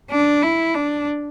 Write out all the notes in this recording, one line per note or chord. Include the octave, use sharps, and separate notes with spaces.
D4
E4
D4